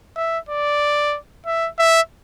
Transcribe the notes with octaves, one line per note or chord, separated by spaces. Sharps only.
E5
D5
E5
E5